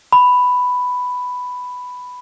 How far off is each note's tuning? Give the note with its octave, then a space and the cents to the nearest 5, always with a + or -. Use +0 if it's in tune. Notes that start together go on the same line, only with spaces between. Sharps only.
B5 +5